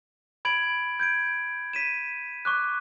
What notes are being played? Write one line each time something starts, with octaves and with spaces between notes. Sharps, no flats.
B5 G#6 D7 F#7
G6 G#6 D7
B6 D#7 E7
C#6 D6 F#6